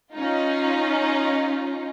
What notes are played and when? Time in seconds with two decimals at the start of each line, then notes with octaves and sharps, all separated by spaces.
0.13 C#4 D#4 F4